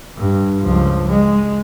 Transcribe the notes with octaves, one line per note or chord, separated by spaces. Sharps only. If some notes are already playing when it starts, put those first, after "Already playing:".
G2
C#2 F3
G#3